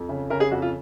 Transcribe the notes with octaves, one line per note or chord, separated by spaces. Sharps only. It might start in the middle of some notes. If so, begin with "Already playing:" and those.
Already playing: F2
C#3
C#3 A#4
G#4
F2 F#4
F4